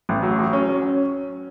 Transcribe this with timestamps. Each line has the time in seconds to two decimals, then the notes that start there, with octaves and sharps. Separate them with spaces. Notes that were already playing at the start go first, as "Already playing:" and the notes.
0.09 A1
0.23 F#3
0.39 F#3
0.53 C#4
0.69 C#4